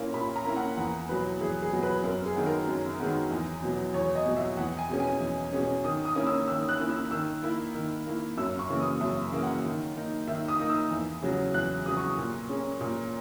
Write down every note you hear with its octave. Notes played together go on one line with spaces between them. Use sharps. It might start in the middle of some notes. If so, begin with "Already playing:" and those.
Already playing: A#2 A#3 C#4 E4
A#2 B5
A#5
A#3 C#4 E4
F#5
E2 F#5
B2 F#3 B4
E2 G#4
G#4
B2 F#3
B4
F#2 A#4
G#4
D#3 G#3 B3
A#4
F#2
D#3 G#3 B3
E2
B2 F#3
E2 C#5
D#5
B2 F#3
E5
E2 F#5
G#5
B2 G#3 C#4
G#5
E2
B2 G#3 C#4
D#3 D#6
D#6
A#3 C#4 E4
E6
D#3 E6
F#6
A#3 C#4 E4
E6
D#3 E6
A#3 E4
D#3
A#3 E4
F#2 E6
C#6
C#3 E3 A#3
D#6
F#2 E5
C#3 E3 A#3
F#5
D#3
A#3 D#4
D#3 E5
D#6
A#3 D#4
E6
E2
C#3 F#3
E2 F#6
C#3 F#3 D#6
C#6
A#2
G#3 C#4
A#2